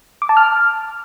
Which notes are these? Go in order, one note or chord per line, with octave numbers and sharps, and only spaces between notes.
D6
A5
F6